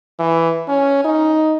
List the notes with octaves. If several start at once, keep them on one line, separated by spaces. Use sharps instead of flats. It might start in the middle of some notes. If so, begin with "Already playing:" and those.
E3
C#4
D#4